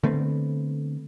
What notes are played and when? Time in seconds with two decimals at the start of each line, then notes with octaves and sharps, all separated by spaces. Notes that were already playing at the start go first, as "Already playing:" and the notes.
0.03 D3 A3 B3 C4